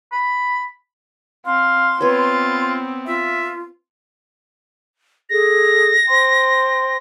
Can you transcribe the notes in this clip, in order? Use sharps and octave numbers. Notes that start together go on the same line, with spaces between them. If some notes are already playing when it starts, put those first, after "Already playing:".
B5
C4 F5 C6
B3 C4 F4 B4 C#5
F4 E5
G#4 A4 A#6
C5 G5 C6